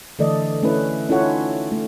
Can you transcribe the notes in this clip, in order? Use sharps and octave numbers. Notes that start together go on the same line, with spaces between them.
D3 E3 A3 A4 D5 D#5
A3 C#4 E4 B4
C#4 E4 F4 A4 C#5 F#5
D#4
A3